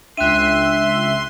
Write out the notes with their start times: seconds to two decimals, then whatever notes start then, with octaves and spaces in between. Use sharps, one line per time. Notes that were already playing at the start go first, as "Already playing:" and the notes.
0.17 C#2 D4 E5 G5 C6 F#6 D#7